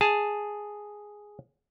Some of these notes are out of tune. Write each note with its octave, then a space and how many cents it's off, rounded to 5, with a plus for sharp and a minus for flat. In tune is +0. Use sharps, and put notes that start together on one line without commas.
G#4 +0 A5 +0